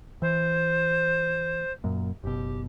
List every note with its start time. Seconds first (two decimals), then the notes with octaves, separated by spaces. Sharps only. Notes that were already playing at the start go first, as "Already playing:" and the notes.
0.22 E3 C5
1.84 F#2 A#2
2.23 F#1 B2 G4